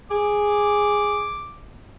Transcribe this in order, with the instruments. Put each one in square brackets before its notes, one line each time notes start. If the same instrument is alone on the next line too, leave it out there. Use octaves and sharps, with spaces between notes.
[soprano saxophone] G#4 [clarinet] D6